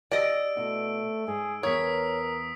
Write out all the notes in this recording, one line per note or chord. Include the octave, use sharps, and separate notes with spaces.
G4 D5 D#5 E6 D7
B2 A3 E4 F#5
G#2 G#4
E2 B3 G#4 A#4 C#5 D#6 B6